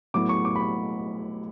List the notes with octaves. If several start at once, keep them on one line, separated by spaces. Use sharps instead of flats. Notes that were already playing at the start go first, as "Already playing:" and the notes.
A2 F#3 B3 E4 D6
C#6
D6
B5
C#6